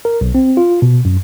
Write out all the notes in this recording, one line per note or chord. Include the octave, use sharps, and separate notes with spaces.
A#4
B1
C4
F4
B2
F#2